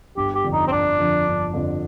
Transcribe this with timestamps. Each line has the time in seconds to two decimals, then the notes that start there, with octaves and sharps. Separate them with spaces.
0.17 G1 G4
0.34 G4
0.44 F2 D3 F3
0.53 D#4
0.67 C4
0.71 G1 D4
0.99 F2 D3 F3
1.27 G1
1.53 F2 D3 F3